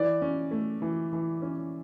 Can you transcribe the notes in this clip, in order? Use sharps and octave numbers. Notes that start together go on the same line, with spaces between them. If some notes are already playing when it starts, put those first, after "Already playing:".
Already playing: E3 D5
C#4
A3
E3
E3
C#4